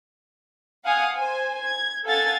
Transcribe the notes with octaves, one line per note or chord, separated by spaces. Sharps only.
F5 F#5 G#5 D#6
C5 G#5
G#6
A4 F5 F#5 G#5 G#6 A6